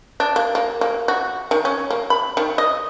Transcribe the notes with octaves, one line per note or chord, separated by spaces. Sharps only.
D4
A#3
A#3
A#3
F#4
D#3
C#4
A#3
B5
D#3
D#5